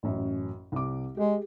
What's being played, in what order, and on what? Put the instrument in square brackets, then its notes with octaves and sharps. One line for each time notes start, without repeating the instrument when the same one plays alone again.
[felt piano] A1 F#2 F#4
C2 D6
[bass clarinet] G#3 [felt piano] G4 G#4